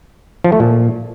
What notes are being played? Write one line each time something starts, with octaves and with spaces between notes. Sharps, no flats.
F3
A3
A#2